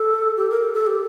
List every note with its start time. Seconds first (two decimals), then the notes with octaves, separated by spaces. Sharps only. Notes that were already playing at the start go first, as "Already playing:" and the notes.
Already playing: A4
0.37 G4
0.50 A#4
0.63 A4
0.74 A4
0.87 G4